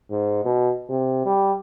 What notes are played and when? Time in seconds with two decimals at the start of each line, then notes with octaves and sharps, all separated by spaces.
0.11 G#2
0.45 B2
0.89 C3
1.25 G3